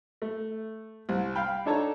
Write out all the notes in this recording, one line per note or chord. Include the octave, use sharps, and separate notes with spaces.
A3
C2
F5 G5 B5
D4 D#4 A4 C#5 A5 A#5